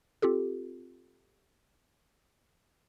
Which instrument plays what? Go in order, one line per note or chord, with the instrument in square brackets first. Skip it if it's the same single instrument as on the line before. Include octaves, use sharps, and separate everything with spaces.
[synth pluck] C4 F4 G4 A4